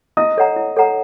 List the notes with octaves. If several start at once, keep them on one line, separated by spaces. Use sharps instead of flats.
E4 D#5 D#6
A4 C#5 F#5 A#5
E4
A4 C#5 F#5 A#5